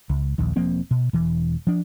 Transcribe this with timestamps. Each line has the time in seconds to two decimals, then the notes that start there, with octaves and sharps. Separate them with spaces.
0.10 C#2
0.38 A#1 D#2
0.56 E1 F3 A#3 C4
0.91 B2
1.13 E1 E3
1.67 F3 D4